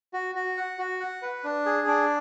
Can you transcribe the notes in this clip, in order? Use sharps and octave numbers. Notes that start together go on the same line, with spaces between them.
F#4
F#4
F#5
F#4
F#5
B4
D4
G#4
D4